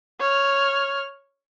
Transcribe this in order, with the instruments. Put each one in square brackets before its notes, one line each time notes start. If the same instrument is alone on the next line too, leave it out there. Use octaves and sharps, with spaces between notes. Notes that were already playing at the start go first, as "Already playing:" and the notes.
[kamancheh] C#5 F6